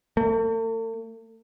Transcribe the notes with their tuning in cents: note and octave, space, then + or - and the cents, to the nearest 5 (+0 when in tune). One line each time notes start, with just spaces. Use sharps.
A3 +45